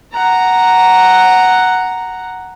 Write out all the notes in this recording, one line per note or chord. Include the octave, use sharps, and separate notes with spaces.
F#5 A#5